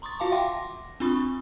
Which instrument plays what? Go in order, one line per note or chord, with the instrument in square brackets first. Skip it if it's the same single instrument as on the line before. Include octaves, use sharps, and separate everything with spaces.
[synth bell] A#5 C6 C#6 D#6 A6
F4 F#4 F5 A5 D6
E5 F#5 G5 C6 D6 A#6
C4 D4 F4 B5 C#6 D#6